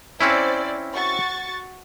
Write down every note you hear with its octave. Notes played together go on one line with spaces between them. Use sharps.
C4 C#4 E4 C5 D5
F#4 C#6 A6